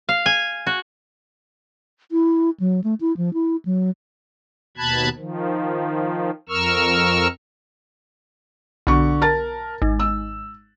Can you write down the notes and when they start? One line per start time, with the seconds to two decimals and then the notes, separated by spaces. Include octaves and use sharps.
0.09 F5
0.26 G#5
0.67 F#4
2.12 E4
2.60 F#3
2.84 A3
3.01 E4
3.17 F3
3.33 E4
3.65 F#3
4.77 D#2 B2 A5 B5 F#6 G#6
5.17 D#3 F3
6.49 F2 A#4 C#6 E6 F6
8.87 B1 D3 C#6
9.21 A#4 A5 A6
9.82 G#1
9.99 E6